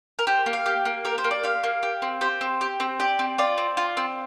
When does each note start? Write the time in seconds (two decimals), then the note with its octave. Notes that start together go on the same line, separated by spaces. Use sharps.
0.19 A#4
0.27 G4 C5
0.46 A#3
0.53 F5
0.66 G4
0.85 A#3
1.05 G4 A#4
1.18 C5
1.24 A#3
1.31 D5
1.44 G4 F5
1.63 A#3
1.83 G4
2.02 C4
2.21 G4 C5
2.41 C4
2.61 G4
2.80 C4
3.00 G4 D5
3.19 C4
3.38 F4 D5
3.58 C4
3.77 F4
3.97 C4